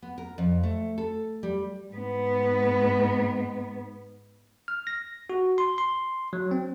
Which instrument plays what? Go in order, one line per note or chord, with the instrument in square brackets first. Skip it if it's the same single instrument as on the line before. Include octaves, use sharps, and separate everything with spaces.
[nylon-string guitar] B3
A#4
F2
A3
A4
G3
[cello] G#2 B3
[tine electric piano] F6
A#6
F#4
C6
C6
F#3
C4